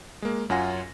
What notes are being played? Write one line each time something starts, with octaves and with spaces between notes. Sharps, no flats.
G#3 A#3
F#2 C#4 F4 F#5 G#5 A#6